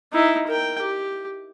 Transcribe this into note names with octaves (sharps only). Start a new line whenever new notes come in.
D#4 E4
A#4 G5
G4